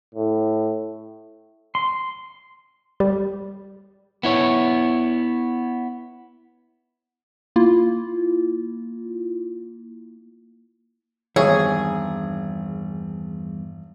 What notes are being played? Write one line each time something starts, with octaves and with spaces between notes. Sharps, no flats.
A2
C6
G3
B3 E4 C#5
A#3 E4 F4
G#1 E2 G2 G#4 C#5